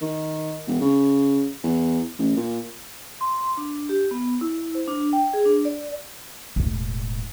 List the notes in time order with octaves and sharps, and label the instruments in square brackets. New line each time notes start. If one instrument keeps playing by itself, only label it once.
[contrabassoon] D#3
E1
C#3
E2
A1
A#2
[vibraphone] C6
D4
G4
B3
E4
C5
D4
G5
G#4
D4
D5
[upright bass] E1 A2